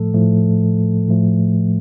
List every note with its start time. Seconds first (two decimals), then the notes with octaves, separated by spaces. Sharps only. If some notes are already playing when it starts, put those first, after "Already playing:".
Already playing: A2 F3 A3 A4
0.14 A2 F3 A3
1.09 A2 F3 A3